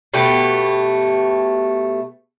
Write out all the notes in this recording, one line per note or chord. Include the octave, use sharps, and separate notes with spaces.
B2 A3 G4